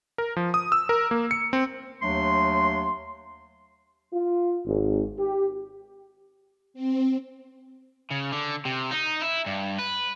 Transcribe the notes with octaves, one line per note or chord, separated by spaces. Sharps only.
A#4
F3
D#6
E6
A#4
A#3
C#7
C4
D#2 F#3 A3 D4 C6
F4
G#1
G4
C4
C#3
D3
C3
D#4
E4
G2
B4